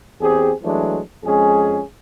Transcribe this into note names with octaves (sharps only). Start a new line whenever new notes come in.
E2 C4 G4 G#4
E3 F#3 G#3 A3 D4
F2 G#3 C#4 G#4